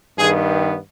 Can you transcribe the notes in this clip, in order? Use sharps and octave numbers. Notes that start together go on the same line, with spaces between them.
G2 D#3 B3 G#4